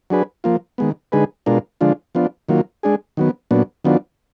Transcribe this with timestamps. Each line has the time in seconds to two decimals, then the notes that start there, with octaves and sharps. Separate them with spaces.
0.10 F#3 D4 G#4 B4
0.44 F3 A#3 F4
0.78 D#3 G#3 B3
1.12 D3 G#3 D#4 G#4 B4
1.46 B2 G#3 D4 F4 A#4
1.81 D3 F3 G#3 D4 F4
2.15 F3 B3 D4 F4
2.49 D#3 F#3 A#3 F4
2.83 G#3 D4 G#4
3.17 D#3 F#3 B3
3.51 A#2 F#3 B3 D4
3.84 D#3 F#3 B3 D4 F4